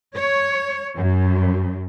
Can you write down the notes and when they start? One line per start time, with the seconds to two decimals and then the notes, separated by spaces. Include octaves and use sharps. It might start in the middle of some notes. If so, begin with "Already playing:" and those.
0.14 C#5
0.96 F#2